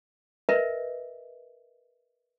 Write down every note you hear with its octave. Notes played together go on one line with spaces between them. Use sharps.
A#4 B4 D#5 E5